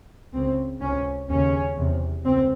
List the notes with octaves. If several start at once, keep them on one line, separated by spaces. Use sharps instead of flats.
C#2 C#3 C4
C#2 C3 C#4
D#2 C#3 C#4
E2 C3
C#2 C4